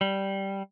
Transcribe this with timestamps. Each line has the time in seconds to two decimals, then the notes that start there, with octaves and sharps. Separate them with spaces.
0.01 G3